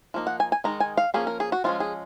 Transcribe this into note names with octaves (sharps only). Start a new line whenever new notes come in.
F3 A#3 D#4
F#5
G#5
G#5
D#3 G#3 D#4 A#5
G#5
F5
F3 A#3 C#4 G#4
A#4
G#4
F#4
F3 G#3 C#4 F4
G#4